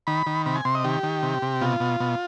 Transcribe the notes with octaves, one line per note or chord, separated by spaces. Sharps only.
D#3 B5
D#3
C3 B5
G#5
C3 C6
D#5
D#3 G4
D#3
C3
C3
B2 F4
B2
B2